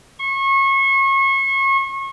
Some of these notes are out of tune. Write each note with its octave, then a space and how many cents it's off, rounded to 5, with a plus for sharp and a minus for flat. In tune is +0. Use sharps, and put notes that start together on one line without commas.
C#6 -30